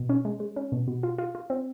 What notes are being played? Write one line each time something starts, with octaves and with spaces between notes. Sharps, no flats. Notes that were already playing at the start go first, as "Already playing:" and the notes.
Already playing: B2
C#4
G#3
G#3
C#4
B2
B2
F4
F4
F4
C4